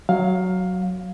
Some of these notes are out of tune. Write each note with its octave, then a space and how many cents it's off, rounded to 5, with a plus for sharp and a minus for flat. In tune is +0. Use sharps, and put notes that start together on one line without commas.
F#3 +0 F5 +15